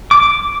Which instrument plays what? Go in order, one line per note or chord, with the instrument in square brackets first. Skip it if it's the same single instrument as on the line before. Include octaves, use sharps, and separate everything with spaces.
[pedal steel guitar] D6